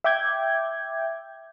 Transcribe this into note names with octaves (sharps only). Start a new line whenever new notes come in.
E5 G5 D6 G6 G#6